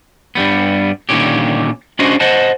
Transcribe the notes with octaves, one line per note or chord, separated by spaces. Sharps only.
G2 G3 B3
A#2 D3 D#3 F3 C#4 G4
C#4 D4 F#4 G#4 C5 D#5
C5 D#5 F#5 A5